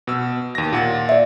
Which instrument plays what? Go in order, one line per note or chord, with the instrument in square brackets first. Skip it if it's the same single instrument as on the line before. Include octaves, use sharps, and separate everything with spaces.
[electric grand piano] B2 E6
D#2 A#6
A#2 F#5 A6
[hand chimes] D5 E5